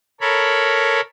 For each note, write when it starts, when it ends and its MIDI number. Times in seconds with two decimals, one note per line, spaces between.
0.21 1.01 69
0.21 1.01 70
0.21 1.01 73
0.21 1.01 83